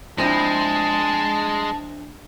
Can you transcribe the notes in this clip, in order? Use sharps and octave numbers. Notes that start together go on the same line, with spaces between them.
F3 G#3 C4 D4 E4 A5 A#6